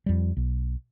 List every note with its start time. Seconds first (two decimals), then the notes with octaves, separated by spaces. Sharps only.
0.06 F2 G3
0.37 B1